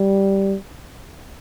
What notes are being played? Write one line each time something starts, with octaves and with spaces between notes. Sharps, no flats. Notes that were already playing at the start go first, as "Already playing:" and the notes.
Already playing: G3